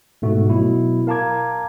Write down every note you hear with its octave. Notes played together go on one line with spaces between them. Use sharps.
G#2 B2 A3 F#4
B2 F#3 E4
A#4 F5 A5 A#5 D6 G#6